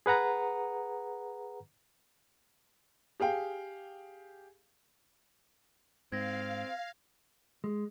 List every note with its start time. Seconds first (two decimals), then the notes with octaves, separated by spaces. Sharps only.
0.06 G#4 B4 F#5 A#5
3.20 G4 G#4 F5 G5
6.12 G#2 C4 F5 G#6 A#6
7.64 G#3